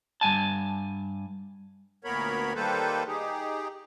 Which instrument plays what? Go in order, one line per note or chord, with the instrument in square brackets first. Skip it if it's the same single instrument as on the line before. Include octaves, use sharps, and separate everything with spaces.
[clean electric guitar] G2 G#5 A5
[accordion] D2 A#2 B3 A#4 C#5 B5
D#3 G3 A#3 A4 B4 C5
D#4 G4 G#4